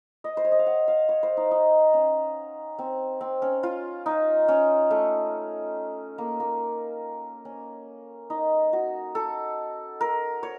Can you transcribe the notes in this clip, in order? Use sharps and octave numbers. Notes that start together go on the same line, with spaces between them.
D#5
C5
C#5
D#5
F5
F#5
F5
C#5
C5
D#4
D#4
C#4
C4
C4
C#4
F4
D#4
C#4
A3
A#3
A#3
C#4
D#4
F#4
A4
A#4
C#5